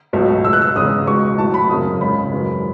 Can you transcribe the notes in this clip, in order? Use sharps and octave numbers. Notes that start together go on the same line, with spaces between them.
C#2 B2 F#3 A3
C#2 B2 G#3 E6
F#6
E6
E1 E2 C#3 E3 G#3 D#6
C#2 B2 G#3 C#6
A1 A2 F#3 A3 A5
B5
G#1 F#2 C#3 D#6
C#2 C#3 G#3 B5
G#1 F#2 E3 G#3